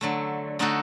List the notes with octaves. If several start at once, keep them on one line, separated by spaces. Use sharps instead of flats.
D3 F#3 A3
D3 A3 D#4 F#4 A4